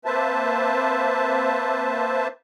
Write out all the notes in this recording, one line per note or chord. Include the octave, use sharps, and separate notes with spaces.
A#3 C4 B4 C5 E5 A5